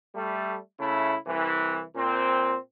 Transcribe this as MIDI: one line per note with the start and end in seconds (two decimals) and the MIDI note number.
0.14 0.58 55
0.14 0.58 57
0.80 1.16 49
0.80 1.16 57
0.80 1.16 64
1.26 1.82 36
1.26 1.82 52
1.96 2.56 46
1.96 2.56 60